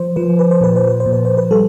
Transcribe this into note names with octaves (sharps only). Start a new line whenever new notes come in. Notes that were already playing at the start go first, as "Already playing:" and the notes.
Already playing: F3 C5
F3 B4
B4
C5
A#2 B4
C5
B4
C5
A#2
B4
C5
B4
G3 A4